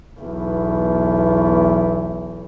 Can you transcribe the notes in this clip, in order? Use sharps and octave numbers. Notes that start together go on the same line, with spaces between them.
B1 E2